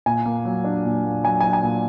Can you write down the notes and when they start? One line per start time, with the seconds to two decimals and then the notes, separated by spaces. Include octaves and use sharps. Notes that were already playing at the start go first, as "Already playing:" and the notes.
0.06 A#2 G#5
0.26 A#3
0.45 F#3
0.64 D4
0.85 A#2
1.04 A#3
1.24 F#3 G#5
1.41 D4 G#5
1.53 G#5
1.63 A#2